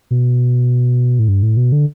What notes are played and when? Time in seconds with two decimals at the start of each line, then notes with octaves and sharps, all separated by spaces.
0.11 B2
1.19 A2
1.28 G2
1.43 A2
1.57 B2
1.72 D3